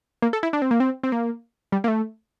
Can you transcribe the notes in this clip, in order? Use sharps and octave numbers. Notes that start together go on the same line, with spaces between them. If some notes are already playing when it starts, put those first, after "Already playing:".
A#3
A4
E4
D4
C4
A#3
C4
C4
A#3
G3
A#3
A3